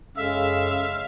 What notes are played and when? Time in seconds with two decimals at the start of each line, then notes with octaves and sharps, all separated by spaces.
0.17 F#2 C#3 G#3 A4 E5 F5